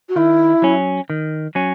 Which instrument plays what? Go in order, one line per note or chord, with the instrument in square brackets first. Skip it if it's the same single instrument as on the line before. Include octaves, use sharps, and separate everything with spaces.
[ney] F#4
[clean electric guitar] D#3 [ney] E4
[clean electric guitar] F#3 C#4
D#3
F#3 C#4